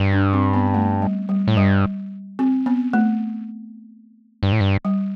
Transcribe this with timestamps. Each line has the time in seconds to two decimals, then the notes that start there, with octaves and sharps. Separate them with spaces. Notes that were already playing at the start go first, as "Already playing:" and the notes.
Already playing: G2
0.13 D4
0.33 C4
0.53 B3
0.74 A3
1.02 G3
1.29 G3
1.48 A2
1.57 G2 G3
2.39 C4
2.66 B3
2.93 A3
4.43 G2
4.52 A2
4.60 G2
4.85 G3